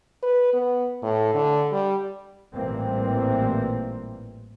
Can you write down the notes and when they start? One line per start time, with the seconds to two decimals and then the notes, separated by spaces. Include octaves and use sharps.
0.23 B4
0.53 B3
1.03 A2
1.34 D3
1.72 G3
2.54 A1 A#2 E3 G3 A#3 C4